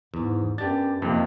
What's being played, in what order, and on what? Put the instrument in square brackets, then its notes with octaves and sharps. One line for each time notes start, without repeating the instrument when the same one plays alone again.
[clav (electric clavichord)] E2 [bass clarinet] G#2
[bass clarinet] F#2 [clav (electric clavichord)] B3 D4 [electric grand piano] G4 A6
[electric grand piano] F2 C3 [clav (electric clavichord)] D#3 [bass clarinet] A#3